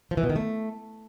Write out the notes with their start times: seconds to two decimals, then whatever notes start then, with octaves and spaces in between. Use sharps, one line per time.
0.11 F3
0.17 E3
0.23 B2
0.30 D#3
0.36 A3